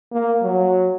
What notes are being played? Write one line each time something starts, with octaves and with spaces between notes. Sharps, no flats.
A#3
F#3